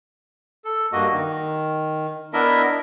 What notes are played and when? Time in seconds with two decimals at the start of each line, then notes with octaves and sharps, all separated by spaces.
0.65 A4
0.92 G2 A#3 F#4 D#5
1.13 D#3
2.34 B3 D4 E4 A#4 D#5 E5